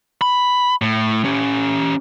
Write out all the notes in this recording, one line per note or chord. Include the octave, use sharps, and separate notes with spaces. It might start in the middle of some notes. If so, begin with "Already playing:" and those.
B5
A2
C#4 G4